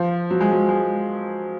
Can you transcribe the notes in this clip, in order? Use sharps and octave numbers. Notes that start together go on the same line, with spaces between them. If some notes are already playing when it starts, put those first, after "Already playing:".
Already playing: F3
F#3
G#3
F#3
G#3